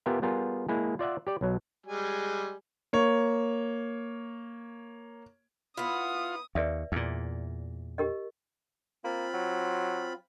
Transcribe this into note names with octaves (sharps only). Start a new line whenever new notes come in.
B3 F4 G4 A#4 E5 G#5
G3 B3 F4 G#4 A#4
G#3 A#3 E4 G#4
F4 D5 E5 F#5
G4 D5
B1 F#3
G3 G#3 G#5
A#3 C#5
B3 E4 F4 D#6
D#2 B4 D5 E5
E2 A#2
G4 A#4 D#5
A#3 C4 F4 B5
F#3